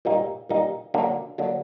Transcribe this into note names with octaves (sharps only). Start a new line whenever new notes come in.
A#2 G3 A#3 D#4
A#2 G3 A#3 D#4
D3 F#3 A#3 D4
D3 F#3 A#3 D4